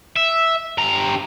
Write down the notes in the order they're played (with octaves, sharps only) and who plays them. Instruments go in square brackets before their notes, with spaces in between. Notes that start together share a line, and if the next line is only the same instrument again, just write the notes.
[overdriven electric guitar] E5
G2 A#5